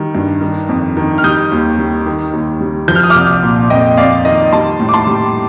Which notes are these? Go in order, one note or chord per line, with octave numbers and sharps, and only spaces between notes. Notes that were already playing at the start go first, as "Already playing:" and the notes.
Already playing: D#3 G3
G2
D#3
F2
D#3
F6
G3 D#6 G6
D#2
G3
D#3
D#2
G3
F3 G6
F6
D#6
D6 F6
C2
A#2
F2 D#5 G5
F2 D5 F5
D#3 D#5
G3 A5 C6
A2
D6
A5 C6
G3